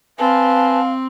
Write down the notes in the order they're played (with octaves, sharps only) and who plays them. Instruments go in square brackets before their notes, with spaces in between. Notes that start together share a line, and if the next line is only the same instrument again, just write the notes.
[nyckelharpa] C4 [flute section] B4 G#5 A5 [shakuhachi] F5